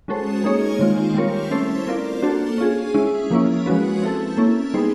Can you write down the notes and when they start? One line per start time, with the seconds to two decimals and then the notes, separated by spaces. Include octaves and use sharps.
0.08 G#3 C#4 F#4 A4 C5
0.44 A#3 D#4 G#4 C#5
0.79 D#3 G#3 C4 F4
1.14 G3 C4 F4 A#4 C#5
1.51 A3 C#4 E4 A4 C5
1.87 C4 F4 A#4 D5
2.22 A#3 D4 F#4 A4 C5
2.58 C#4 F4 G#4
2.94 G#3 C#4 E4
3.30 F3 A#3 C#4 E4
3.66 F3 G#3 C#4 F#4 B4
4.02 C4 E4 A4
4.37 A#3 C#4 E4 A4
4.74 G3 B3 D#4 G#4 C5